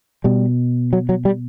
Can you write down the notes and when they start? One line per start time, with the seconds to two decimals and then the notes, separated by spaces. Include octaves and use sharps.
0.24 B2 G3
0.93 F#3
1.09 F#3
1.25 G3